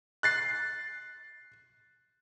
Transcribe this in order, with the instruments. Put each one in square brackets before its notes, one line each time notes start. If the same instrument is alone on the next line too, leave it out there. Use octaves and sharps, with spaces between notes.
[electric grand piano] F#6 A6 C7